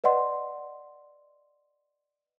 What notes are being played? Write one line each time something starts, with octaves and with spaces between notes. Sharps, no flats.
B4 D5 D#5 F#5 C6